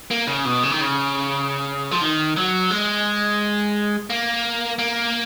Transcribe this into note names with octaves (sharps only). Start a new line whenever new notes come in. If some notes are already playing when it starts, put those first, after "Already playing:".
A#3
C#3
B2
C#3
D#3
C#3
F3
D#3
F#3
G#3
A#3
A#3